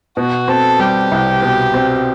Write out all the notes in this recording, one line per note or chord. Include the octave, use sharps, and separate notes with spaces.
B2 F#4
C4 A4
G3 G4
C2
B2
C4